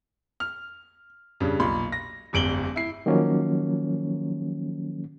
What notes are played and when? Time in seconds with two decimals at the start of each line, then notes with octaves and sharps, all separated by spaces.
0.40 F6
1.40 G2 C#3
1.60 B1 A#2 B5 C6
1.92 A#6
2.33 D1 G1 D7 F#7 G7
2.76 E4 C7
3.06 D#3 F3 F#3 A#3 C#4